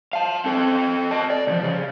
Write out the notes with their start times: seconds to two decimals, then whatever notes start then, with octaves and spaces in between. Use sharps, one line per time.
0.13 F5 A5
0.45 C4 A4
1.11 D#5 A5
1.30 D5
1.47 C2 F3
1.64 C#3